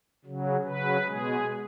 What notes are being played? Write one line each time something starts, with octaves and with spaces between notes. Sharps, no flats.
C#3 F#3
C#3 F#3 B4
B2 G#3 G#4